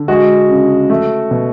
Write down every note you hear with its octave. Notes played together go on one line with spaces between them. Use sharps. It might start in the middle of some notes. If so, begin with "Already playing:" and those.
Already playing: D3
G#3 F#4
C#3
A3
B2